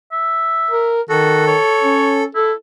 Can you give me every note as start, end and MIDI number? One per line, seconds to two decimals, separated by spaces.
0.12 0.94 76
0.71 1.01 70
1.10 1.55 51
1.10 1.42 66
1.10 2.23 69
1.48 2.26 73
1.82 2.26 61
2.35 2.51 64
2.35 2.53 69